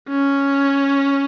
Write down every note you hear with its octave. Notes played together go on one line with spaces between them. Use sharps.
C#4